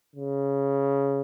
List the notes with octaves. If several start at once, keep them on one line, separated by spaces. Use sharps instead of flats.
C#3